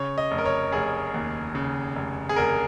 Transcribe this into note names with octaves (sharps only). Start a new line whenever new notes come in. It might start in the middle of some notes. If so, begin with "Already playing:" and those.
Already playing: C#3 C#5
D#5
F1
A#4
C#5
F1 G#4
D#2
C#3
F1
G#4
F1 A#4